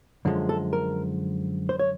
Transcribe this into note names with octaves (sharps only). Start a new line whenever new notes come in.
F#2 D3 F3 G#3
A4
A#4
C5
C#5